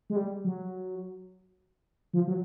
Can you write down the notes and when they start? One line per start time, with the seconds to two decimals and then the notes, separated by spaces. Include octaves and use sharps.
0.10 G#3
0.16 G3
0.44 F#3
2.13 F3
2.27 F#3